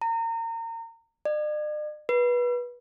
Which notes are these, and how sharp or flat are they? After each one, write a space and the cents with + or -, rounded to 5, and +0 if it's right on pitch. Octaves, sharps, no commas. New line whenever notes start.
A#5 -30
D5 +45
B4 -20